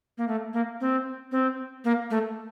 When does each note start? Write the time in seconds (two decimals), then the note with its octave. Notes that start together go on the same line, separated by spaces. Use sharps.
0.18 A#3
0.28 A3
0.53 A#3
0.81 C4
1.32 C4
1.84 A#3
2.10 A3